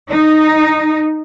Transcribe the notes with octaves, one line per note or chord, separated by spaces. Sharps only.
D#4